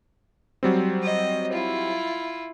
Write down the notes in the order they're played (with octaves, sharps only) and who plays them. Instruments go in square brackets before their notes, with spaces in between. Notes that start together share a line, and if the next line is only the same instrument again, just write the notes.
[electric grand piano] F#3 G3 C4
[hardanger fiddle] D#5
E4 F4